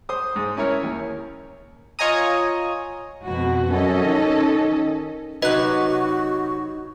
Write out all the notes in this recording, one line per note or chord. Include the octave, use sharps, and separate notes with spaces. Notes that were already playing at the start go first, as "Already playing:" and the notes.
C5 D#6
G#2 D#6
C#4 E4 A#4 C#5
D#2
F4 C#5 D#5 G#5 A#5 D#6
F2 B2 F#4
F#2 C#4 A4 D#5
D#3
C3 F#3 D#4 F#4 B4 D#5 F#6